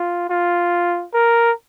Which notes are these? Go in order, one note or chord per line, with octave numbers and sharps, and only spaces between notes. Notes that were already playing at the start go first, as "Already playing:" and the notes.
Already playing: F4
F4
A#4